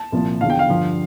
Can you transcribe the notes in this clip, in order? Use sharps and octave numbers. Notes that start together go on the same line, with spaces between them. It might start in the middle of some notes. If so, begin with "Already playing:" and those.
Already playing: A5
C2 A#2 F3
E2 D3 F3 F5
G5
F5
G2 D3 F3